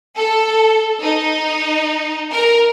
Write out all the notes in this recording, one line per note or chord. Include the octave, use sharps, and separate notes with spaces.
A4
D#4
A#4